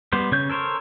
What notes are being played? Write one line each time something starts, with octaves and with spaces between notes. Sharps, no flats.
G3 B3 C5
C#3 C#5 G6
A4 A#4 C5 C#5